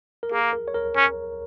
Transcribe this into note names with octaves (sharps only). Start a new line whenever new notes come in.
A#4
A#3 G#4
A#4
C#5
A#4
C#4